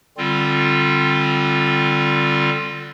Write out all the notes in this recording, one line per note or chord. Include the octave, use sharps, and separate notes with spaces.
D3 G3 C4 F4